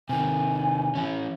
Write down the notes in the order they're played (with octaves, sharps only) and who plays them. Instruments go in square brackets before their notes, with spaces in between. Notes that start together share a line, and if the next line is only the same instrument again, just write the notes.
[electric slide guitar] C3 D#3 [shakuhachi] G#5
[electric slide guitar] E3 C#4